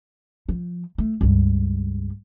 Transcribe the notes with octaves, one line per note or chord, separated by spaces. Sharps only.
F3
A3
C#2 G2